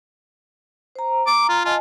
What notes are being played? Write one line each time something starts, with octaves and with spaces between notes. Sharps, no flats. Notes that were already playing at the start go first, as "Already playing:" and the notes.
C5 A#5
A#5 D6
F4
F4 D#5 G#5 A5